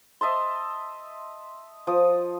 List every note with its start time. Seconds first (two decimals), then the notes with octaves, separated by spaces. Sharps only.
0.21 D#5 E5 A5 C6
1.87 F3 D#6